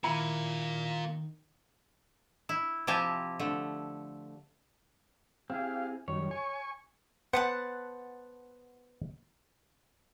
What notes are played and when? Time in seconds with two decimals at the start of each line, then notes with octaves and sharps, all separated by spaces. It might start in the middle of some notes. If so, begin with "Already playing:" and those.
0.04 A#2 D#3 A#3 E4 A#5 B5
2.49 E4
2.87 C3 F3 E4 G4 G#5 A5
3.39 D3 A3
5.50 C4 E4 G4 G#4 F5
6.08 F#2 D#3 G3 C#5
6.31 G#5 C#6
7.33 B3 B4 C5 F#5 A5 F#6